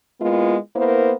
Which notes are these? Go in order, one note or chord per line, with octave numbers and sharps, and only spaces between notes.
G#3 A#3 B3 E4 F4
A#3 B3 E4 A#4 C5